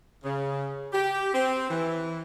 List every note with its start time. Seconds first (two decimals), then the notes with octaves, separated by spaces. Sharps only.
0.24 C#3
0.93 G4
1.34 C4
1.70 E3